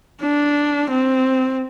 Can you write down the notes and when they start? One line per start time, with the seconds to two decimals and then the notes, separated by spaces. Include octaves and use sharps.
0.22 D4
0.91 C4